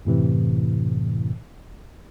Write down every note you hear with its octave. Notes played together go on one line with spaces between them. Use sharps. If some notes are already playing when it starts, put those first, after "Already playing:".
F#2 A2 C3 E3